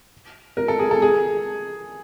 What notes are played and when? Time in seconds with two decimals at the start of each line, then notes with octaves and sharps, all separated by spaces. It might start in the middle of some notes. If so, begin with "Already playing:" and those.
0.57 A#4
0.68 A4
0.79 G#4
0.91 A4
1.02 G#4